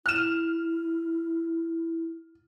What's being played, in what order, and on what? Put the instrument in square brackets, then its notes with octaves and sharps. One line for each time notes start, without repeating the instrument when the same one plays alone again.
[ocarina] E4 [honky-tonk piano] F6 E7